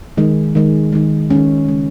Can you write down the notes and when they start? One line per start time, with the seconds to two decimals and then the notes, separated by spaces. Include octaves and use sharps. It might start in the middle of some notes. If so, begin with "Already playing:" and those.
0.17 D#3 G#3
0.55 D#3 G#3
0.93 D#3 G#3
1.30 D#3 G#3 C#4
1.68 C#3 G#3